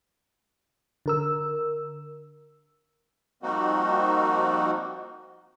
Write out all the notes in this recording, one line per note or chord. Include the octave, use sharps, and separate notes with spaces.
D3 A#4 E6
F3 G3 A#3 C4 D#4 F#4